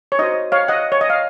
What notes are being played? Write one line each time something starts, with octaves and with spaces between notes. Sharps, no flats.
C#5
D#4 F#4 C5 D#5
C#5 F5
D#5 F#5
C#5
D#5
F5